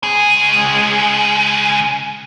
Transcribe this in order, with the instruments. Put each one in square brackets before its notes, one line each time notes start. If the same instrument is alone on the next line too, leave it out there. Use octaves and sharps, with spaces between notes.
[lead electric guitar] C#2 G#4